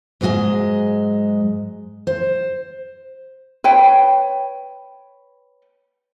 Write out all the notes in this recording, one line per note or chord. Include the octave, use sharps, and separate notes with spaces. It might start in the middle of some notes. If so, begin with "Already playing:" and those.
G#2 F#3 G#3 F#4 D#5 G#5
C5
B4 C#5 G5